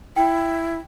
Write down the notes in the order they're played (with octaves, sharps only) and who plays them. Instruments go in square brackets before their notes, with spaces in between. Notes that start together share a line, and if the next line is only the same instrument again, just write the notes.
[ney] E4 [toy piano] G5